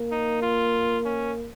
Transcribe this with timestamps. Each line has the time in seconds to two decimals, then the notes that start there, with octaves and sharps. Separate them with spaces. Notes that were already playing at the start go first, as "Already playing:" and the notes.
Already playing: A#3
0.12 D#4
0.42 F4
1.05 C#4